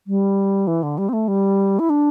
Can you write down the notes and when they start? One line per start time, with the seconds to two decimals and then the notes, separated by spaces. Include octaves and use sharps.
0.07 G3
0.67 E3
0.83 D3
0.98 G3
1.09 C4
1.13 A3
1.28 G3
1.79 E4
1.90 D4